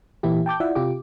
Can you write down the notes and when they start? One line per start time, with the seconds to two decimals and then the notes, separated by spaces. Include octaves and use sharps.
0.23 A#2 E3 E4 G4
0.46 G5 A5 D6 G6
0.60 E4 F4 D5 E5 F#5
0.75 C3 F4 G4 D6